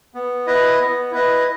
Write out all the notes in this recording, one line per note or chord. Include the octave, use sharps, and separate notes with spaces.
B3
E4 B4 D#5
B3
E4 B4 D#5